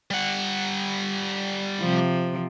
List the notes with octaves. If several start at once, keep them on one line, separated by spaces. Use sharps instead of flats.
G3 F#5
C3 F3